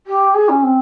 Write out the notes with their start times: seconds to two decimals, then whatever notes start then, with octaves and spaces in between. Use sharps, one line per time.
0.06 G4
0.34 G#4
0.49 C#4
0.62 C4